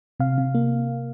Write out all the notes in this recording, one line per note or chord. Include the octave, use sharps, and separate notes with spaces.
C3 F5
C3
A#3